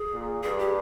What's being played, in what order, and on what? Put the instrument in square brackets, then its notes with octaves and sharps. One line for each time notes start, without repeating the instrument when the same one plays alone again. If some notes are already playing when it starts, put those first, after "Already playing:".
Already playing: [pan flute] G#4
[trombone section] A#2
[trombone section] G2 [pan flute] G#4
[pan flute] G4